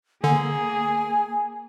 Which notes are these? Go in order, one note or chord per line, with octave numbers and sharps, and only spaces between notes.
D3 A#3 G#4 G#5